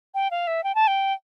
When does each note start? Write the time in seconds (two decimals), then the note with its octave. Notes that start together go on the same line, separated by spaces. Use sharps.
0.14 G5
0.31 F5
0.47 E5
0.64 G5
0.75 A5
0.87 G5